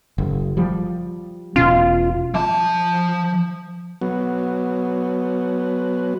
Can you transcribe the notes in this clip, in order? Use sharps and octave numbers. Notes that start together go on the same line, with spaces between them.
F#1
F3 G3
E1 B2 C#4 F4
F3 A5
F#3 B3